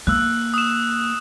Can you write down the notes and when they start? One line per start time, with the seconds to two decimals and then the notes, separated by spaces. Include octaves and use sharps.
0.07 A#3 E6 F#6
0.54 D#6 E7